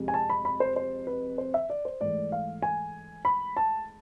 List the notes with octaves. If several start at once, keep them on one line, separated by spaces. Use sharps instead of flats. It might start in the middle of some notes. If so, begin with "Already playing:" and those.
Already playing: F2 C3 G#3
G#5
A5
B5
B5
C5
C5
B4
C5
E5
D5
C5
G#2 E3 A3 D5
F5
G#5
B5
A5